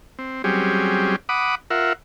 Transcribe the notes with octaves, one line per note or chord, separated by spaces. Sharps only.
C4
F#3 G3 C4 C#4 G4 G#4
F#5 B5 D6 D#6
F4 A#4 E5 F#5